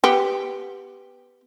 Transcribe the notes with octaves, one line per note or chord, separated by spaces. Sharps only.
B3 G4